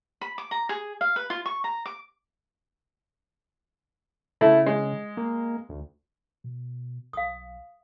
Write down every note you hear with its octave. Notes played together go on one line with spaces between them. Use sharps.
B5
D6
A#5
G#4
F5
B4
F4
C#6
A#5
D6
C#3 A3 E4
G#3
A#3
D2
B2
B1 F5 D#6